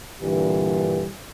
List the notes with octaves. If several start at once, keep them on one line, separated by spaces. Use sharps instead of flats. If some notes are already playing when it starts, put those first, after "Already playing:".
G2 A#2 D3 E3 D4 G4